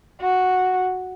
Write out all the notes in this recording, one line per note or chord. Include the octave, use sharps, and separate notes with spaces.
F#4